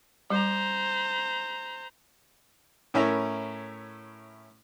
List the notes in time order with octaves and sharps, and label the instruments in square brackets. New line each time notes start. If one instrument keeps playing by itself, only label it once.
[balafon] G3 [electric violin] C5 A#5
[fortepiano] A2 C#4 E4 A#4 A#5